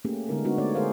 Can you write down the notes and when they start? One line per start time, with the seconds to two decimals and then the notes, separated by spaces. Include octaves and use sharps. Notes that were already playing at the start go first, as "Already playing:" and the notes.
0.05 A3 A#3 C#4 G4 G#4
0.29 D3 G#3 B3 D#4 E4 A#4
0.45 G#3 B3 D4 D#4 F#4
0.58 A3 B3 C#5 D5
0.75 D3 G#3 G#4 A#4 C5 F5